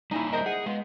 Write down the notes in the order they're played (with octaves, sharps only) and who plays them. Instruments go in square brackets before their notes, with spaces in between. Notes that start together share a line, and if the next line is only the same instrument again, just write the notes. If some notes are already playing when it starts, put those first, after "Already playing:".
[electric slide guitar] G3 A#3 G#5 [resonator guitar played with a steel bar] D#4 E4
[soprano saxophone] A#4 [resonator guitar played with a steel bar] C5 D#5 E5
[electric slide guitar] G#4 [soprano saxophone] F#5
[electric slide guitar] G#3 [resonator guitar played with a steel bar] B3 [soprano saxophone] F4